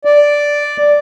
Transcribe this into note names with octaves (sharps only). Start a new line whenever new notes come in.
D5